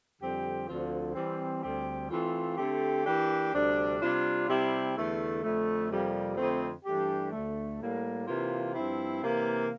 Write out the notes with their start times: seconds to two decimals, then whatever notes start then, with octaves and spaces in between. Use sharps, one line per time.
0.20 F2 D3 G3 C4 G4
0.67 D2 D3 F3 C4 F4
1.15 E3 G3 C4
1.62 D2 D3 G3 C4 G4
2.09 E3 A3 C4 F4
2.57 D3 A3 C4 G4
3.05 E3 A#3 D4 G4
3.52 D2 C3 G3 D4
3.99 C3 G3 D4 F4
4.47 C3 G3 C4 E4 G4
4.95 E2 D3 A3
5.41 F2 D3 A3
5.89 F2 C3 G3 A#3
6.37 F2 D3 A3 C4
6.84 G2 E3 A3 D4 G4
7.32 D2 D3 A3
7.80 A2 G3 A#3
8.27 C3 E3 A#3 F4
8.74 G2 F3 C4 E4
9.22 C3 E3 A#3